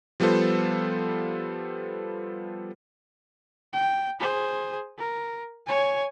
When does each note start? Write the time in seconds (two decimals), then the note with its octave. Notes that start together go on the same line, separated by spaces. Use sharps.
0.20 F3 G3 B3 F4 A4 C5
3.73 G5
4.20 G#4 C5
4.98 A#4
5.67 C#5 G#5